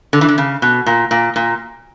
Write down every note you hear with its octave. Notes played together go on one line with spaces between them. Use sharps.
D3
E3
D3
C#3
B2
A#2
A#2
A#2